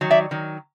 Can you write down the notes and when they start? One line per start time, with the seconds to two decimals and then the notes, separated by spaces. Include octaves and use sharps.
0.01 D#3 F#3
0.10 D5 E5
0.31 D#3 F#3